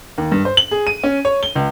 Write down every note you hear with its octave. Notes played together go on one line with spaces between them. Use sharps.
D#2
G2
C5
F#7
G#4
D#7
C#4
C#5
G7
C#2